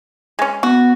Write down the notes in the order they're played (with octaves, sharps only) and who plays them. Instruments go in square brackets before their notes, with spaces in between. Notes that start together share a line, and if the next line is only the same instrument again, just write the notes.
[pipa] G#3 C#4
[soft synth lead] B3 [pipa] F#4